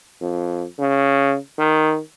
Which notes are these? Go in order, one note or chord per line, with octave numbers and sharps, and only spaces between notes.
F2
C#3
D#3